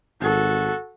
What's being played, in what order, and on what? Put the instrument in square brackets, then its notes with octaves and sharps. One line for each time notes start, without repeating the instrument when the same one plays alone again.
[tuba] G#1 [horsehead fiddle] F#4 A4